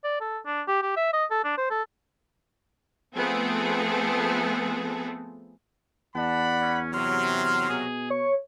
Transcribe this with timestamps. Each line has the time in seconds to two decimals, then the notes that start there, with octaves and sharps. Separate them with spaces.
0.04 D5
0.21 A4
0.46 D4
0.68 G4
0.82 G4
0.97 E5
1.13 D#5
1.31 A4
1.44 D4
1.58 C5
1.70 A4
3.16 F3 A3 B3 C4 G#4 A4
6.15 E2 D5 F#5 A5 B5
6.61 C#4
6.94 C3 F#3 C6 F6
7.69 B2 G#4
8.10 C#5 C#6